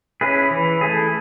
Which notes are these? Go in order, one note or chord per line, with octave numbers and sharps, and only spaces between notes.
C#4 E4 G#4 B4
E3
A3 E4 G#4